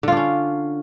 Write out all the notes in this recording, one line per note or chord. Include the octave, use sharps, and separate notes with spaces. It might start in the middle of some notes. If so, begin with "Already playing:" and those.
D3 C#4 D4 F4